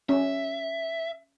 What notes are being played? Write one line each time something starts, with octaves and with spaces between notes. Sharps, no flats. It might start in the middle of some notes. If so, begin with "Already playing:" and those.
C#4 E5